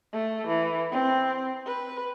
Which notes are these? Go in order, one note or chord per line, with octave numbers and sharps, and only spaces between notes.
A3
E3
C4
B4